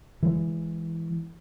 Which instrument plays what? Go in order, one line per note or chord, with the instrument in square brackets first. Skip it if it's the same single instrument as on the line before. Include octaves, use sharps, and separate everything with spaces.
[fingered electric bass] E3 G#3